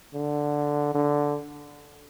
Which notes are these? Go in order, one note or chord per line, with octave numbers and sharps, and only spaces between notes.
D3
D3